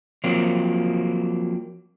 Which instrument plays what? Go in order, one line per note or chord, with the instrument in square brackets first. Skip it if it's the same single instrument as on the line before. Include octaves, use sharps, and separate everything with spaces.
[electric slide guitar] F3 F#3 A#3 C4